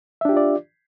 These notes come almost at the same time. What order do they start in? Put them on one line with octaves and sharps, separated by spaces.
E5 D4 G4 F4 D5